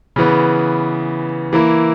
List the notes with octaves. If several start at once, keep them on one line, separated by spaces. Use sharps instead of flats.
C#3 E3 B3
E3 A#3 E4